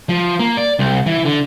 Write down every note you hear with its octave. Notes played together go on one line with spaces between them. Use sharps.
F3
A#3
D5
C2
E3
D3